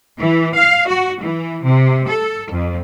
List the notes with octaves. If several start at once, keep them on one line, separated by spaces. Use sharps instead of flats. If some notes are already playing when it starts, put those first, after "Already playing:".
E3
F5
F#4
E3
C3
A4
F2